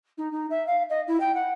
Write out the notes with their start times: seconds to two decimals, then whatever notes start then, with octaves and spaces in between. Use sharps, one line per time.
0.17 D#4
0.32 D#4
0.50 E5
0.66 F5
0.89 D#5
1.07 E4
1.20 G5
1.34 F#5